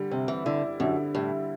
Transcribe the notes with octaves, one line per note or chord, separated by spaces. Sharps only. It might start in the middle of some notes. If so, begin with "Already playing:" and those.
Already playing: D3 G3
C3 C4
E3
D3 E4
F#2 D3
A2 G3